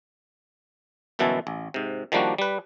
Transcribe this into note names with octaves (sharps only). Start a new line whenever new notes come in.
G1 F#2 B2 E3 E4 A5
A1
G#2 C3
D#3 F3 G3 A#3 D4 F#4
G3 B4